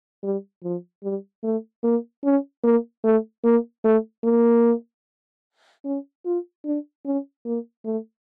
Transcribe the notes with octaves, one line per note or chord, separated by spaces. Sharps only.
G3
F3
G3
A3
A#3
C#4
A#3
A3
A#3
A3
A#3
C#4
F4
D4
C#4
A#3
A3